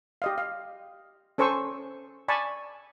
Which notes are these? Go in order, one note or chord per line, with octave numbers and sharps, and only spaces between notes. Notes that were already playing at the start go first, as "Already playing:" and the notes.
G4 D#5 F5
F5
C#4 A4 C5 G#5 C#6 E6
D5 G#5 A5 B5 C#6